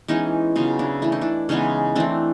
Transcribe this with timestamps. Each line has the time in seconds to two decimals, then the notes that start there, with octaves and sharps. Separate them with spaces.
0.08 E3 G#3 B3 C#4 D#4
0.56 C#3 F#3 B3 D#4 F4
0.79 D4 E4
1.02 E3 A3 E4
1.12 D#4
1.21 D4 E4
1.49 C#3 E3 G#3 B3 C#4 D#4
1.95 E3 A3 C4 D4